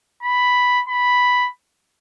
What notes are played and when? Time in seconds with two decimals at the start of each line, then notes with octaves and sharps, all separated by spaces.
0.23 B5
0.88 B5